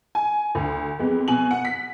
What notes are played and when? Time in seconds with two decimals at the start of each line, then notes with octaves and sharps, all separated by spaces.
0.15 G#5
0.55 D2
0.99 F2 G#3 B3
1.28 B2 G#5 F#7
1.51 F#5
1.65 B6